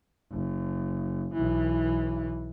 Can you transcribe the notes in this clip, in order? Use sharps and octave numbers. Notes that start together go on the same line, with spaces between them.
F#1
B1 E3